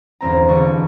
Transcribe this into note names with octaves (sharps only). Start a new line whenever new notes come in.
G1 E2 C4 A#5
E1 D3 G3 A4 C#6